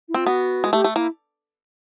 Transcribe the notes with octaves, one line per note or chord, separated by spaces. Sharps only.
E4
C4 F4
B3 F#4
G#3
A3 G4
A3
A#3 E4